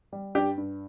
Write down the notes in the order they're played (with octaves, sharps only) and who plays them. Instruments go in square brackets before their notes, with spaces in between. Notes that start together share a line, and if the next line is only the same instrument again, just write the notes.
[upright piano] G3
G2 D4 G4
G2